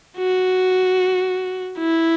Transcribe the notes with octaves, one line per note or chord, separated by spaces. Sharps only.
F#4
E4